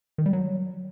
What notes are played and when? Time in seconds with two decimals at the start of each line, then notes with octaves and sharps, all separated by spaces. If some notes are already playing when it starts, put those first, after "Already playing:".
0.18 D#3
0.26 G3
0.33 F#3